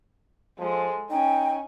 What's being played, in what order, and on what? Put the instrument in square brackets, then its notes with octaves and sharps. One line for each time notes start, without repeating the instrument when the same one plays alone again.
[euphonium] F3 [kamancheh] G#3 A4
[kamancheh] C#4 [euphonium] D#4 [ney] G5